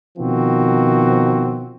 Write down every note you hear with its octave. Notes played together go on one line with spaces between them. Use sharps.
B2 D#3 F3 C4 F#4